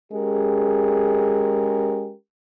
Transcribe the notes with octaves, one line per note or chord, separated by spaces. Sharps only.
G#3 C#4 G4 G#4 A#4